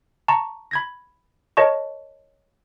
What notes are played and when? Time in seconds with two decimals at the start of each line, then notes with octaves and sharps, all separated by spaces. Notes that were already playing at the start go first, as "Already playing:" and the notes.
0.28 A5 A#5 C#6
0.71 B5 G#6 A#6
1.57 A#4 C#5 D#5 A5 C#6